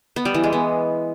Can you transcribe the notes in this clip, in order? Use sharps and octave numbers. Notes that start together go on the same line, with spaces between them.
B3
G3
E3
G#3
B3